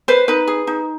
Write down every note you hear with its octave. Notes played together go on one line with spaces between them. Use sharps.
B4 C5
D#4 B4
G#4
D#4